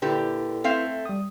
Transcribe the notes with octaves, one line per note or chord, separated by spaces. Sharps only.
A#2 D3 E4 G4 A4 B4
A3 C4 F5
G3 D#6